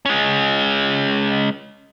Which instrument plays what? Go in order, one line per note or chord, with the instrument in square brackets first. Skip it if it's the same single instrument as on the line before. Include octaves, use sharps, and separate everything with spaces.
[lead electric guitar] G#3 C#4